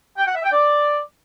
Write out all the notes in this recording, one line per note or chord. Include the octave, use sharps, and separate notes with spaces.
G5
F#5
E5
G5
D5